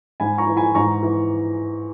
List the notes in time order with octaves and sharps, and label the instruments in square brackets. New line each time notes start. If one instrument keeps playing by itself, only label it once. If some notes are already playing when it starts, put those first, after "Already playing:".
[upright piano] G#2 G#5 B5
A#5 C#6
E3
G#5 B5
G#2 A#5 C#6
E3